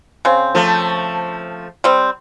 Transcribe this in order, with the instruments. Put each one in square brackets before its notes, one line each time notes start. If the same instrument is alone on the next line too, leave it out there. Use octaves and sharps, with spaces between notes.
[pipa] C#3 C4
[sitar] F3 A3
[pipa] G3 C4